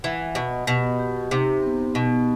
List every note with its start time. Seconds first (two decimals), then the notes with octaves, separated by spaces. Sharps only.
0.03 E3 F#5
0.35 B2 D#5
0.67 B2 G4
0.99 G4
1.31 C3 D#4
1.62 B3
1.95 B2 B3